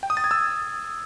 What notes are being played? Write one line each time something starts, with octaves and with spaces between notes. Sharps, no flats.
G5
D#6
A6
G#6
E6